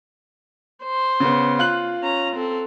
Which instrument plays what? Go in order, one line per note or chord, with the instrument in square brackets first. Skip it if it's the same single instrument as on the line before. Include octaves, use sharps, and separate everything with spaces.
[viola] C5
[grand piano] C#3 B3
F4 F#6 F#7
[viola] C#4 A#5
C4 A4